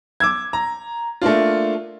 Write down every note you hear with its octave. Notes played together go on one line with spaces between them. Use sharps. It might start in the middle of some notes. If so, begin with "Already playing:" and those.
D6 E6 G#6
A#5
A3 A#3 D4 F4